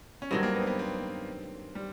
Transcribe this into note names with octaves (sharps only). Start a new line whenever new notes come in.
C#4
G2 D#3 F#3 C4
A#3
B3
C4
B3
C4
G3